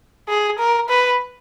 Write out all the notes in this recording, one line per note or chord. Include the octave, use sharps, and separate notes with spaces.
G#4
A#4
B4